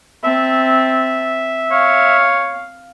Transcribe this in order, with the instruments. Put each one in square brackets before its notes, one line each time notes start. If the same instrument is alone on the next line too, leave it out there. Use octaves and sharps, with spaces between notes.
[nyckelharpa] C4 A5 [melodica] E5
[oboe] C#5 [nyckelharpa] F5